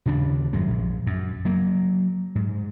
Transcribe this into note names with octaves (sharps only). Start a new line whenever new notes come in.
D#2 C#3 B3 D4
G#1 F#2 G#3
A#1
F#2
F#3 A#3
G#2